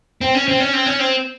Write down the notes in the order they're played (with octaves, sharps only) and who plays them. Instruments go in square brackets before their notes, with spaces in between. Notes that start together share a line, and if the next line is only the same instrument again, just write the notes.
[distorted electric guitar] C4
C#4
C4
C#4
C4
C#4
C4